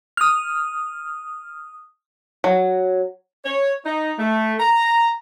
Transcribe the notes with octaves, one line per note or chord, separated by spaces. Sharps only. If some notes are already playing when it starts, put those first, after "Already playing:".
D#6 F6
F#3
C#5
D#4
A3
A#5